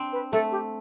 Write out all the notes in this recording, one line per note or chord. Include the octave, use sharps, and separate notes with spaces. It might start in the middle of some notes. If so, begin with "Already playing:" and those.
Already playing: C4 D4
B4
A3 A4
G4